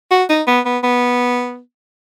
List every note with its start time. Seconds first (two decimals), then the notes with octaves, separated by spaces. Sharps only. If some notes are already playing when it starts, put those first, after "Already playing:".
0.11 F#4
0.29 D#4
0.47 B3
0.65 B3
0.84 B3